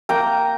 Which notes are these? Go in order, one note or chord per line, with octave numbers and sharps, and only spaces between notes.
A#3 G5 A#5